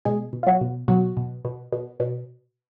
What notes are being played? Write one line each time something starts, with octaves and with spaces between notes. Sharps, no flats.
B2 G#3 G#4
B2
F4
F#3 F#4
B2
B2 F#3 F#4
B2
B2
B2
B2